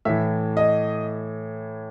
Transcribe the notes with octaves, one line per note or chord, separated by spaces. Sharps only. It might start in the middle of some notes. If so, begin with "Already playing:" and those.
A2 E3 E5
D#5